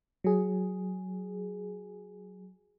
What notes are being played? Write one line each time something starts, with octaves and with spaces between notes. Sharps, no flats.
F#3 G#4